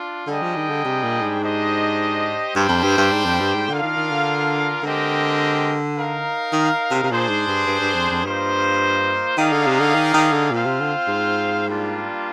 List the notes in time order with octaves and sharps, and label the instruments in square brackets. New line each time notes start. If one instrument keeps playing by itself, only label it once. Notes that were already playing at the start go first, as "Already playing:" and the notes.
Already playing: [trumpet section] D4 F4
[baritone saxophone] D3 [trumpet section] G3 D4 G#4 D#5 G5
[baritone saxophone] F3
D#3
D3
C3
A#2
G#2
[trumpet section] D4 G4 C5 D#5
[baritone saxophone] G2 [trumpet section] G3 D4 G4 C5 G5
[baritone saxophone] F2
G2
G2
G#2
F2
G2
G#2
[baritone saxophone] D3 [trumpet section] D4 F4 A#4 F5
[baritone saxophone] D#3
D#3
D3
[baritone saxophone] D3 [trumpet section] G#3 C4 G4 A#4 D#5
[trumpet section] D#4 A#4 F5
[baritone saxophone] D#3
C3
C3
[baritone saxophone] A#2 [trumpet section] D4 G#4 C5
[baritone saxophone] G#2
G2
G2
G2
F2
F2
[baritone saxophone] G2 [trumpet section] A#3 F4 C5 D#5
[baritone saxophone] D#3 [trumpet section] D#4 G#4 D5 F5
[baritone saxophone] D3
C3
D3
D#3
D#3
D3
[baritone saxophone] A#2 [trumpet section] C4 F4 C5 F5
[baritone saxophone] C3
D3
G#2
[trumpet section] G3 A#3 D4 F4